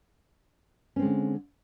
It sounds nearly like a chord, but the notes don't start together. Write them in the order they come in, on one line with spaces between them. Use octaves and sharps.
C#4 C4 G#3 D3